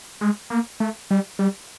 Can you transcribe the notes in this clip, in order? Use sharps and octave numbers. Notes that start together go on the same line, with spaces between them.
G#3
A#3
A3
G3
G3